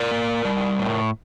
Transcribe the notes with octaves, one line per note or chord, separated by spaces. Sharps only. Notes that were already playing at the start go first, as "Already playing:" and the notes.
Already playing: A#4 D5
A#3
G3
A2